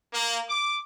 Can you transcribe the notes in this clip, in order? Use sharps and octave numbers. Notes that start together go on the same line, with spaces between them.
A#3
D6